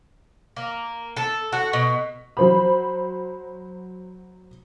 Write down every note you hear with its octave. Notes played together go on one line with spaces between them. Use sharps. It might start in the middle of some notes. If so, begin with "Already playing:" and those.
A#3
A4
F#4
B2
F#3 C5 B5